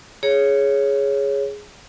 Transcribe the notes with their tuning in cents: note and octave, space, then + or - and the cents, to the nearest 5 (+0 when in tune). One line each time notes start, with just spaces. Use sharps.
G#4 +0 C#5 +0